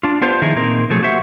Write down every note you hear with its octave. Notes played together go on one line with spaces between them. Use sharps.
D4 F4
B3 D4 F4 G4 B4 C5
D#3 F3 D#4 E4 G#4
A#2 A#3 C4 D#4 A#4
B2 F3 F#3 A3 G#4
A#3 F#4 G4 C5 E5 F#5